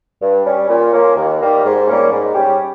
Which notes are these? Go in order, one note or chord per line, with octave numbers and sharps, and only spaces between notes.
G2
G3 C#4
A#2
F3 A#3 C#4
D#2
D#3 G3 A#3
G#2
G3 A#3 C#4
G#2
G3 C#4 G4